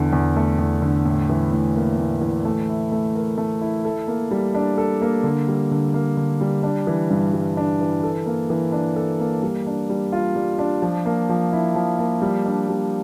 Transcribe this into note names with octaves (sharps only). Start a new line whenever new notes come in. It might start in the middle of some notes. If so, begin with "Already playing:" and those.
Already playing: E2 D3
E2
A3
E2
D3
A2
E3
A2
A#3
A2
E3
A3
E4
A3
A#4
A3
E4
A4
A#3
G3
D4
A4
A#3
D3
G3
D3
A#3
D3
G3
D4
E3
G2
G3
D4
E3
A4
A#3
E3
D4
A4
A#3
G3
D4
G3
F4
G3
D4
F3
A#3
F3
E4
F3
A#3
G3
D4
G3